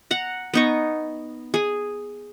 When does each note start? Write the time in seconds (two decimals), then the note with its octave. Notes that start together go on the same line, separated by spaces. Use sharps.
0.11 F#5 A#5
0.54 B3 D#4 C#6
1.54 G#4 G#5